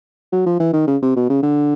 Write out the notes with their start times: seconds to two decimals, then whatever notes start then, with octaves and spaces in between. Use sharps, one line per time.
0.32 F#3
0.46 F3
0.60 E3
0.73 D#3
0.87 C#3
1.02 C3
1.16 B2
1.30 C#3
1.43 D3